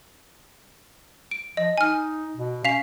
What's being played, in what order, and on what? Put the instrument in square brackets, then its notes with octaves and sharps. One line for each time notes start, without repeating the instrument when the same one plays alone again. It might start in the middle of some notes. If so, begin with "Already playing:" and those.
[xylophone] D7
[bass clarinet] F3 [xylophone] D#5
[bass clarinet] D#4 [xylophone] G#5 F6
[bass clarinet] B2
[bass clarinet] C#4 [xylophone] F5 B6 F7